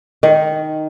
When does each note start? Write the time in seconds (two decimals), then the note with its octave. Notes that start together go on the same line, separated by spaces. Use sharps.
0.23 D#3